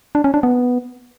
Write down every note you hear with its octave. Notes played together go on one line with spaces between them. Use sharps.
D4
C#4
D4
B3